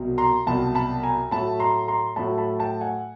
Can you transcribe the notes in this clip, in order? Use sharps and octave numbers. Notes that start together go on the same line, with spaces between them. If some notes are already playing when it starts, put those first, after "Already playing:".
Already playing: C2 B2 F#3
A#5 C6
C2 B2 F#3 A5 B5
A5 B5
G#5 A#5
A2 F#3 A3 A5 B5
A#5 C6
A#5 C6
A2 F#3 A3 A5 B5
A5 B5
G5 A5
F#5 G#5